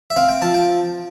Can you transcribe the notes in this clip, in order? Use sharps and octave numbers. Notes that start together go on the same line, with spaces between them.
E5
C4 F5
G5
F3 A5
G5